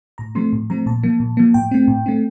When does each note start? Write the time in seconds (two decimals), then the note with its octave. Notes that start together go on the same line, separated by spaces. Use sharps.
0.18 A2 A#5
0.35 F3 A3 C4 C6
0.53 A2
0.70 F3 A3 C4 A#5
0.86 A#2 A5
1.03 F3 A#3
1.20 A#2
1.37 F3 A#3
1.54 A2 G5
1.71 A3 C4
1.88 A2
2.06 A3 C4